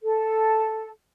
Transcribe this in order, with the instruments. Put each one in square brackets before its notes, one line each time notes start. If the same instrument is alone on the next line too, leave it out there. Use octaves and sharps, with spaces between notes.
[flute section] A4